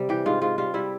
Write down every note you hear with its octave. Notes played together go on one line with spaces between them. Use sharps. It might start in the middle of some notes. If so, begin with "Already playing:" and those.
Already playing: C3 G3
E3 G4
G#2 F4
G#2 F4
G3 F4
G3 E4